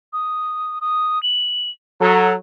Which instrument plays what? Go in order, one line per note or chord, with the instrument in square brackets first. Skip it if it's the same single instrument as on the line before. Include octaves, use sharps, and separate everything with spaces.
[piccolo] D#6
D#6
F#7
[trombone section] F#3 A4 [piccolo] A#5